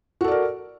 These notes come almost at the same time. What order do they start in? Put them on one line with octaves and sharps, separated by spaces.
F#4 A4 D5 A#4